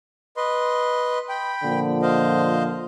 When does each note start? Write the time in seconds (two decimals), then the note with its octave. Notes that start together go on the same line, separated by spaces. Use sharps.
0.37 B4 D#5 C6
1.29 G5 B5
1.64 A#2 D3 F3
2.02 C5 D#5 F5